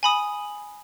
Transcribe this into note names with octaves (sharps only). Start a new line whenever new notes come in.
G#5 B5 D#6